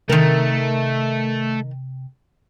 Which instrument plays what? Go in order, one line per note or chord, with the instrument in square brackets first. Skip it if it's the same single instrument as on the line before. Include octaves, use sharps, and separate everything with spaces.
[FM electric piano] C3 [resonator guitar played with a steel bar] D#3 A#4 [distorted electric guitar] A3